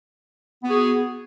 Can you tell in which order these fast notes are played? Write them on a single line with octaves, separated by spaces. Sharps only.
B3 F#4 G#4